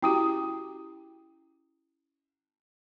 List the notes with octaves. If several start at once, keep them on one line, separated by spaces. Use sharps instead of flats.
C#4 E4 F#4 G4 A#5 D#6